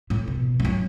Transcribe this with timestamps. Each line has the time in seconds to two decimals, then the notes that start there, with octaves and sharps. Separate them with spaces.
0.10 A2
0.28 B2
0.60 G3
0.65 F#3